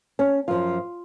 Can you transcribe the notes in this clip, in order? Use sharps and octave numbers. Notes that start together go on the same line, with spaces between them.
C#4
F#2 F3 F4